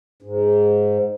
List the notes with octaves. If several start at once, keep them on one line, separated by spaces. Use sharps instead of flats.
G#2